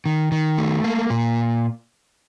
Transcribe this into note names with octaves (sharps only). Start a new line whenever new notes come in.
D#3
D#3
A3
A#3
A#2